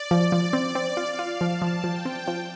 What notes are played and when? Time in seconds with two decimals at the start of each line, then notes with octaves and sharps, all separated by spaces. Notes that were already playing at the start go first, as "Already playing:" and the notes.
Already playing: D5
0.11 F3
0.32 F3
0.53 C4
0.75 C4
0.97 F4 F5
1.19 F4
1.40 F3 A5
1.62 F3
1.84 F3 G5
2.05 C4
2.28 F3